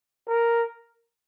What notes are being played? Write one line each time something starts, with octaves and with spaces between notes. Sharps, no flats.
A#4